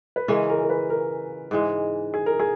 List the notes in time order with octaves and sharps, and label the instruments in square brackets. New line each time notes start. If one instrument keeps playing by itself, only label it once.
[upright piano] B4
[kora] C#3 E3 G#3 C#4 [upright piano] A#4
[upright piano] A#4
A#4
B4
A#4
[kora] G#2 E3 G#3
[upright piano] G#4
A#4
G#4